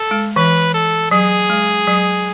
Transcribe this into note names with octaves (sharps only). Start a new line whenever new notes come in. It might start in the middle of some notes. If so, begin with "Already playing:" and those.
Already playing: A4
G#3
E3 B4
A4
F#3 G#4
G#3
F#3